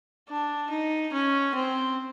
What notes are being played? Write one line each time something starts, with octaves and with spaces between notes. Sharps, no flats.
D4
D#4
C#4
C4